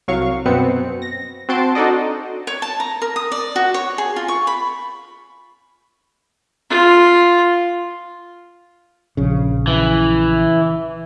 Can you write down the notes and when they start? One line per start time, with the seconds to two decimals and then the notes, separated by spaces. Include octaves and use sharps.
0.08 C2 F#3 F5 C#6
0.46 F#2 B2 B3 C4 C#7
1.02 A#6
1.49 C4 F#4 A5 C6 D7
1.75 D4 D#4 F#4 A4 D5 D#5
2.47 C#5
2.62 A5
2.80 A#5
3.02 A#4
3.16 D#6
3.32 D5
3.56 F#4
3.74 C#5
3.98 G#4
4.16 F4
4.28 C#6
4.47 B5
6.70 F4
9.17 A#1 C#3
9.67 E3